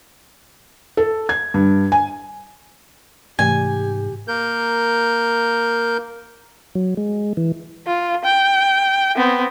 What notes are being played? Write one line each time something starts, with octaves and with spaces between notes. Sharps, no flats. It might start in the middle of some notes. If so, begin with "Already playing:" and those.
A4
G#6
G2
G#5
G#2 C3 E3 A3 G4 G#5
A#3 A#4 G6
F#3
G#3
E3
F4
G5
B3 C4